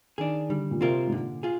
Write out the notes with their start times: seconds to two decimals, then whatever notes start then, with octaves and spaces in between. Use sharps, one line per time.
0.18 D#3 D4 G#4
0.49 D3 G3
0.71 A#2
0.80 C3 C4 F4 A#4
1.07 G#2
1.12 A#2 D3
1.43 F4 G#4